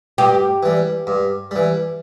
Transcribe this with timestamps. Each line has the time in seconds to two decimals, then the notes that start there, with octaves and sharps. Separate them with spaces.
0.18 G2 G4
0.63 E3 G3
1.07 G2
1.51 E3 G3